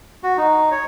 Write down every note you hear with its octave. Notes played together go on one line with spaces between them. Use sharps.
F#4
D#4
C#5